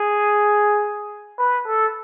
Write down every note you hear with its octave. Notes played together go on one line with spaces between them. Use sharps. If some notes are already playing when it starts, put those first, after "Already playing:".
Already playing: G#4
B4
A4